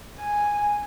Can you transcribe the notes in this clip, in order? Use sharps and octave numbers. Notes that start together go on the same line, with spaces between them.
G#5